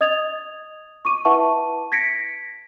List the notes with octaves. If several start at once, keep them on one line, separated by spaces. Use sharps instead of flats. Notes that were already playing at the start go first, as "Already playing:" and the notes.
D#5 D#6 G#6 A6 F7
C#6 D6 D#7
E4 B4 E5 F#5 A5 C#6
G#6 A#6 B6 C#7 D7